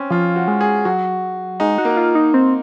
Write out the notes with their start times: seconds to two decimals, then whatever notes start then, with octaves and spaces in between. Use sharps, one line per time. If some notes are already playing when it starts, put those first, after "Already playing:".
Already playing: C4 C#4
0.11 F3 F4
0.36 F#4
0.48 G#3
0.61 G#4
0.85 F#3 F#4
1.60 G#3 D#4
1.78 F#4
1.85 A#3
1.97 F4
2.15 D#4
2.34 C4